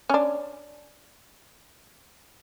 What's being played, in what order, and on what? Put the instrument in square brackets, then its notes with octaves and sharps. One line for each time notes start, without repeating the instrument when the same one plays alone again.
[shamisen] C#4 D4